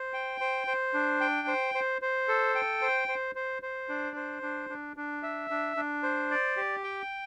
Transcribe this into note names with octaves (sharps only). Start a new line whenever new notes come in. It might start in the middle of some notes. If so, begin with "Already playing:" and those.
Already playing: C5
G5
C5
C5
D4
G5
C5
C5
C5
A4
G5
C5
C5
C5
C5
D4
C5
D4
D4
D4
E5
D4
D4
C5
D5
G4
G5